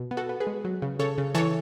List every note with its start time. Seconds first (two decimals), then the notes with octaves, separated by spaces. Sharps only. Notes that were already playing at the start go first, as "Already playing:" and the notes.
Already playing: B2
0.11 B3
0.17 F#4 A4
0.29 B3
0.40 G#4 B4
0.47 G#3
0.65 F#3
0.82 C#3
0.99 C#3 A4 C#5
1.18 C#3
1.35 E3 A4 C#5